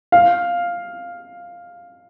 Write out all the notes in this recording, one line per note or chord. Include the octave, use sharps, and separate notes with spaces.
F5